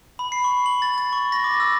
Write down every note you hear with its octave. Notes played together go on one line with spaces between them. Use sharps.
B5
C7
C#6
F#7
A6
A6
C#6
A#6
D6
E6